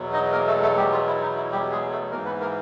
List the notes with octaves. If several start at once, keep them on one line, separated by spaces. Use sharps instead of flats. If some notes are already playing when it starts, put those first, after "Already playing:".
Already playing: E2 B2 F#3
D#4 D#5
A#3 A#4
A3 A4
A3 A4
G3 G4
F3 F4
E4
D#4
E4
G3 G4
G#3 G#4
A3 A4
G#2 E3 A#3 A#4
B3 B4
A#3 A#4